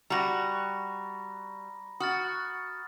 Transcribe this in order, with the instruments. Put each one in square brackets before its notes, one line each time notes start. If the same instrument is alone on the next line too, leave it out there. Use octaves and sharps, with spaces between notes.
[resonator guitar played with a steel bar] G3 F#4 [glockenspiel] A#5 B5 A#6
[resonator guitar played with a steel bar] F#4 [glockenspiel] D#6 F6 A6